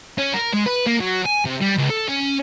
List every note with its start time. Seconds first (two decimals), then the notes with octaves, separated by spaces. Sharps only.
0.18 C#4
0.34 A#4
0.54 G#3
0.66 B4
0.86 A#3
1.00 F#3
1.26 G#5
1.46 C3
1.62 G3
1.78 C#2
1.90 A4
2.08 C#4